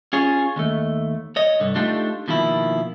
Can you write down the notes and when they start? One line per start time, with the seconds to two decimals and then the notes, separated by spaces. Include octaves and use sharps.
0.13 C#4 F4 G#4 C#5
0.56 D#2 A3
1.36 C#5 D#5
1.60 C2 G2 D3
1.75 A3 D4 D#4 F4 G4 A4
2.28 B2 D#3 F3 A#3 E4